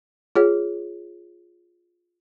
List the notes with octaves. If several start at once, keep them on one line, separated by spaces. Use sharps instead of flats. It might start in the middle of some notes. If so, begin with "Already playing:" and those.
F4 G#4 C#5